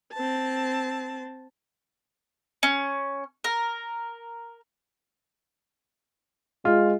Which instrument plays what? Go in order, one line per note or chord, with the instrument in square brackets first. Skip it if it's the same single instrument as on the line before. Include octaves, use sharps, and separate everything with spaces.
[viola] C4 A5
[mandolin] C#4
A#4
[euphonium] G#3 [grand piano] F4